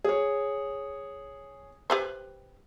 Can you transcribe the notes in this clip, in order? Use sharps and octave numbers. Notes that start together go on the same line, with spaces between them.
G#4 C#5
G4 B4 C5